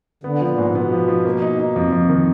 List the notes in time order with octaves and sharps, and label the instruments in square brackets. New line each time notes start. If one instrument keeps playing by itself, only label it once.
[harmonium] D3 [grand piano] B3
[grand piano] F3
[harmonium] A#2
[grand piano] G#2
[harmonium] D3
[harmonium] B2 [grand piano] B3
[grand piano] F3
F3
A#3
D#4
D#4
F2
F2
D#3